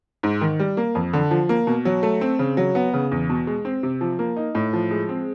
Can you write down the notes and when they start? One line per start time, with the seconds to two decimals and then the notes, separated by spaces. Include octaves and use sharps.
0.23 G#2
0.41 D#3
0.59 G3
0.77 A#3
0.95 F2
1.13 D3
1.31 F3
1.49 A#3
1.67 B2
1.85 F#3
2.03 A3
2.21 C4
2.39 C#3
2.57 F#3
2.75 B3
2.94 C#3
3.11 E2
3.29 B2
3.47 G#3
3.65 C4
3.83 C3
4.01 F3
4.19 A#3
4.36 D#4
4.55 A2
4.73 F3
4.91 G#3
5.09 C4